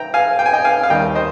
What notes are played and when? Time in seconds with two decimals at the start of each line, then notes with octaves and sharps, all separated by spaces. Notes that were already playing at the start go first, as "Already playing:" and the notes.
Already playing: G5 A#5
0.14 F5 G#5
0.39 G5
0.46 G#5
0.53 D#5 G5
0.65 F5 G#5
0.83 F5
0.90 D#2 D#3 G3 D#5 G5
1.15 C5 D#5